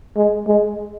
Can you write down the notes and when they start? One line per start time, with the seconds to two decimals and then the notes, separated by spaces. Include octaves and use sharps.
0.17 G#3
0.48 G#3